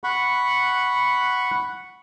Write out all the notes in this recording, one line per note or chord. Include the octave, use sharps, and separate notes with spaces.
F#5 B5 C#6